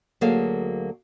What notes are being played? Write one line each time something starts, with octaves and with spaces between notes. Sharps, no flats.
D2 F#3 A#3 G#4 A4 F5